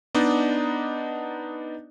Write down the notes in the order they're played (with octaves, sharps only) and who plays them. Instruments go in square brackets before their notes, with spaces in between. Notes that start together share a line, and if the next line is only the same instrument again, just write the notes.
[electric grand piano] B3 D4 D#4 D5 D#5